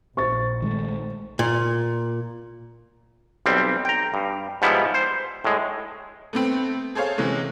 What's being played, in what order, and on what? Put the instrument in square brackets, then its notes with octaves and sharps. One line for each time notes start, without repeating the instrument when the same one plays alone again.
[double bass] A#1 [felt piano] C5 A6 [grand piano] C#6
[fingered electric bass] D#3 G#3 A3
[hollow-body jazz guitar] A#2
[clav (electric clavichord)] B1 G3 C4
G5 A#5
G2
G#2 F3 G3 B3 E4
C5
A2 G#3
[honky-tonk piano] A3 B3 C4
G#4 A4 C5 C#5 F5
C3 E3 G#3 C#4